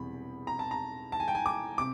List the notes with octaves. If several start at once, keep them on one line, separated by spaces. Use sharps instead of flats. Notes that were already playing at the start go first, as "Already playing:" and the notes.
Already playing: E1 E2 C3 E3 G3 B5
A#5
A5
A#5
A5
G#5
G5
G#5
D6
C3 D6